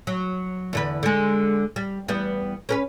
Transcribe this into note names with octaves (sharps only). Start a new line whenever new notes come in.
F#3
E2 D3 B4
D3 G#3
G3
E2 G3 B3
C#4 A#4 B4